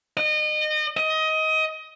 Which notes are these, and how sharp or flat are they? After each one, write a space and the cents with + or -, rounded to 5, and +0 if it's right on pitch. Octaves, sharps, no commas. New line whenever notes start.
D#5 -30
D#5 +20